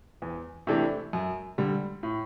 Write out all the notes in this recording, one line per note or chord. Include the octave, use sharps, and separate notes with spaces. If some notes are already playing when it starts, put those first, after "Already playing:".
E2
C3 E3 A3 D4
F#2
D3 G3
A2